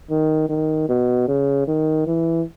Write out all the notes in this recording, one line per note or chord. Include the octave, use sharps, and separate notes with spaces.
D#3
D#3
B2
C#3
D#3
E3